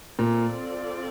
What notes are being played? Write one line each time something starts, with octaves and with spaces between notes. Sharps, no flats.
A#2 C4 F4 A4 D5